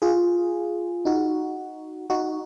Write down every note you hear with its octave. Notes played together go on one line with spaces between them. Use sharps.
F4 G#4
D#4 F#4
D#4 F#4